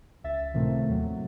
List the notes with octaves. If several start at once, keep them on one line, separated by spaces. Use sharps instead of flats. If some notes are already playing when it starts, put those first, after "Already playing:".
C#2 E5 A6
A2 C3 D#3 F3 A3 C4
D#2 F#3